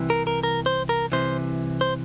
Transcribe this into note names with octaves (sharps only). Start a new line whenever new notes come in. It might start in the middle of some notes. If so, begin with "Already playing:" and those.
Already playing: C2 C3 E3
A#4
A#4
A#4
C5
A#4
C2 C3 E3 C5
C5